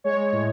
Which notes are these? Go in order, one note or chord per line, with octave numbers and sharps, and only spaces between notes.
G#3 C#5
A2